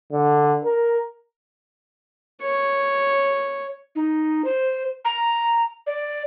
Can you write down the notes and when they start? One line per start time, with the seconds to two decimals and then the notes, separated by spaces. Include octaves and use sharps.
0.12 D3
0.64 A#4
2.42 C#5
3.96 D#4
4.45 C5
5.05 A#5
5.87 D5